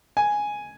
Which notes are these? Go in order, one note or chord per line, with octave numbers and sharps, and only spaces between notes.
G#5